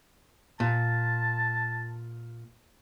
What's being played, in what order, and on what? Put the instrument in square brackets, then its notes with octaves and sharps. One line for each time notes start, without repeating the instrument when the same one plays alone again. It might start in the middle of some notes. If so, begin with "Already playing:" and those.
[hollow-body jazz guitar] A#2 [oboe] A5